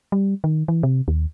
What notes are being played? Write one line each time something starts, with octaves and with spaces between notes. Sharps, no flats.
G3
D#3
E3
C3
D#2